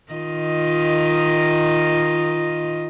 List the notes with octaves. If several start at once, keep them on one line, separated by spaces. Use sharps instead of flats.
D#3 F4 D#5